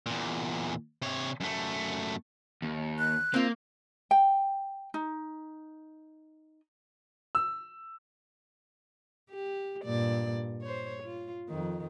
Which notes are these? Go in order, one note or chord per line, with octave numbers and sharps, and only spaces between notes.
E2 A#2
C3 C#5
F#2 A3
D#2
F#6
A#3 C4 F4
G5
D#4
E6
G4
G2 A#2 D5
C5 C#5
F4
F2 D#3